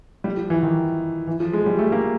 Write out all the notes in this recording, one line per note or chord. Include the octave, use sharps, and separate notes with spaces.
G3
F3
E3
D#3
E3
F3
G#3
G3
A3
A#3